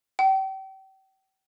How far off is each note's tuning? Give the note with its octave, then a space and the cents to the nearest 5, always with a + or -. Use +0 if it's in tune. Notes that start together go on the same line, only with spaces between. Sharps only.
G5 -35